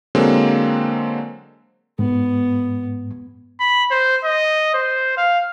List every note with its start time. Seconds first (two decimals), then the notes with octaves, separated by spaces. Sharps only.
0.15 D3 F#3 G#3 A#3 C4
1.99 G#2 B3
3.60 B5
3.91 C5
4.24 D#5
4.74 C5
5.17 F5